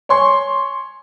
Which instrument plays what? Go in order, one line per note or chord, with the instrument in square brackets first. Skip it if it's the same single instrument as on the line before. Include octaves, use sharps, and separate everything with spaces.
[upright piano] C#5 G#5 C6 C#6